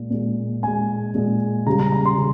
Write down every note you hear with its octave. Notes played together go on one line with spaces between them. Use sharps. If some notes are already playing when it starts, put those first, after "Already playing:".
Already playing: A#2 G#3
A#2 G#3
A#2 G#3 G#5
A#2 G#3
C#3 G3 A#5
A#5
A#5
C6
C#3